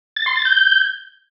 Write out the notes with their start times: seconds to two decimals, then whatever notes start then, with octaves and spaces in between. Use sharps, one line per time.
0.16 A6
0.26 C6
0.36 A6
0.45 G6